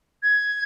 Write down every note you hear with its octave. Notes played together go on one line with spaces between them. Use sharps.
G#6